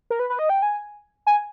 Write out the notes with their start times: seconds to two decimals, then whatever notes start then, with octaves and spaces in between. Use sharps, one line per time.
0.10 A#4
0.19 B4
0.30 B4
0.39 D#5
0.49 G5
0.62 G#5
1.27 G#5